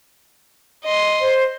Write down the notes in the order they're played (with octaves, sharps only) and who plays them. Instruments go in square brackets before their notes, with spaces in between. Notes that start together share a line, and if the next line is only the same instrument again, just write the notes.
[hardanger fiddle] D#5 C6
[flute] C5